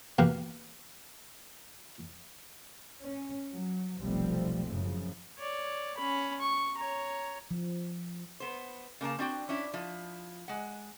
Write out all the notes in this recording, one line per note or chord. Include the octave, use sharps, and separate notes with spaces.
A#3 B3 F#4 G4 A#4
C#4
F#3
F1 B1 F3 G3 A3 C4
F#2 A2 C#3 F3
C#5 D5
C#4 B5
C#6
C#5 A#5
F3
B3 C5
C#3 A#3 A#4 A5
C4 D4 F#4 G5
C#4 D4 E4
F3 E4
G#3 F#5